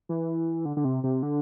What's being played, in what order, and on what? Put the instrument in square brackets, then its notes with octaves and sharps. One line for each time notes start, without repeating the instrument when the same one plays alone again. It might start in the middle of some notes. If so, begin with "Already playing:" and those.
[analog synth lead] E3
D3
D3
C3
C3
D3